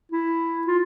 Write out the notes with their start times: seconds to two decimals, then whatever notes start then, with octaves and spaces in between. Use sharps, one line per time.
0.12 E4
0.67 F4